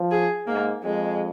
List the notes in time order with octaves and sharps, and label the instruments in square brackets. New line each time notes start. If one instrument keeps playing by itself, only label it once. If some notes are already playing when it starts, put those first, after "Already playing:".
Already playing: [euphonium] F3
[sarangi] G#4
[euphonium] G#2 [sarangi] A#3
[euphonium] F2 [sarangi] G#3